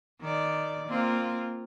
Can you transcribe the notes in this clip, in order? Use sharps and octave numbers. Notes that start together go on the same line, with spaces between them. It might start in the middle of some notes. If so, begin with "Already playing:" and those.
D#3 D5
A#3 C4 F4